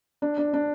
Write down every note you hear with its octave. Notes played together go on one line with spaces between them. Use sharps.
D4
D4
D4